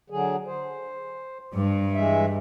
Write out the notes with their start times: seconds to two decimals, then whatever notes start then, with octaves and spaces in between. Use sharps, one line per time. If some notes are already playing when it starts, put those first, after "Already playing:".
0.10 D3 F#3 G#4
0.46 C5
1.54 G2
1.94 E3 G#3 E5